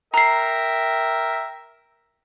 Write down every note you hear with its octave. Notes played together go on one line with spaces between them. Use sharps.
A#4 E5 G5 A#5 C7